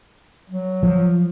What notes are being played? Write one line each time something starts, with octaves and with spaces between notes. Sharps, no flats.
F#3
F3